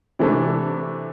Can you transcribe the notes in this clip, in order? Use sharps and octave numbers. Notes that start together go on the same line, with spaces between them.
C3 E3 A3 D4